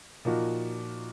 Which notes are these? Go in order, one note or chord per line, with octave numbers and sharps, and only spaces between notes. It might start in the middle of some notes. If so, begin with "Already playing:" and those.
A#2 F3 A#3 D#4 F#4